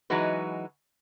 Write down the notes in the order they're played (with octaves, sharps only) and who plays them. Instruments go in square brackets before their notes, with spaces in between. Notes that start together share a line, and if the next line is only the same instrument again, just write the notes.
[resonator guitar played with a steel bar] E3 F#3 G#3 D#4 F#4 B4